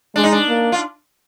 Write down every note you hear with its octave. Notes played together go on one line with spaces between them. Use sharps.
G#3 D4
D#4
D4
A#3
F4